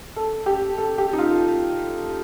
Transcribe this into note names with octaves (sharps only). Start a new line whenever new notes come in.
A4
G4
A4
G4
D#4
F4